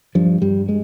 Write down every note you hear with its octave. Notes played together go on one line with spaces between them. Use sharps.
G2 F3
G2 G3
G#3